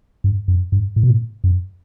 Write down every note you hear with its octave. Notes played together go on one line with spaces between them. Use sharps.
G2
F#2
G2
A2
B2
A2
F#2